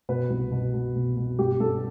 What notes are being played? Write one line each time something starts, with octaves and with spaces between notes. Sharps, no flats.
B2 B4
C2
B2
B2
B2
B2
G2 G4
G2 A4